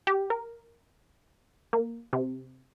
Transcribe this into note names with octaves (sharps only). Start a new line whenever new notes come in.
G4
A#4
A#3
C3